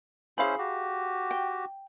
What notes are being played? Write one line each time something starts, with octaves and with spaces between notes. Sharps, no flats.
C#4 E4 G#4 C5 F5 B5
F#4 G4
G5